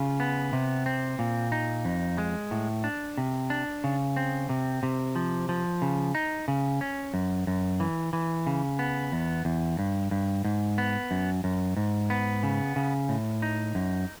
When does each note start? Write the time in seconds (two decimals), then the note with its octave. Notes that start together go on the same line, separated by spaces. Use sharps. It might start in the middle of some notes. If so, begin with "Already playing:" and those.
Already playing: C#3 F4
0.20 B3
0.53 C3
0.86 C4
1.19 A#2
1.52 D#4
1.85 F2
2.18 G#3
2.51 A2
2.84 D4
3.18 C3
3.50 D4
3.84 C#3
4.16 C4
4.50 C3
4.83 C3
5.15 F3
5.49 F3
5.82 C#3
6.15 D#4
6.48 C#3
6.81 C#4
7.14 F#2
7.47 F#2
7.80 E3
8.13 E3
8.47 C#3
8.79 B3
9.12 E2
9.45 E2
9.79 G2
10.11 G2
10.45 G#2
10.78 B3
11.11 F#2
11.44 F#2
11.77 G#2
12.10 B3
12.43 C#3
12.76 C#3
13.09 A2
13.42 D#4
13.75 F#2